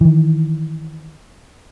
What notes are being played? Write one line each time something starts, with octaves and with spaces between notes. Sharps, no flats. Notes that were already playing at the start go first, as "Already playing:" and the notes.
D#3 E3